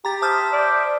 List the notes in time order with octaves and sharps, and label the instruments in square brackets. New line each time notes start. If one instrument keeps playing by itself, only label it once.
[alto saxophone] G4 [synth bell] A#5 A6
[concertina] C5 E5 [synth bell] A5 D#6 F6
[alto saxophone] D5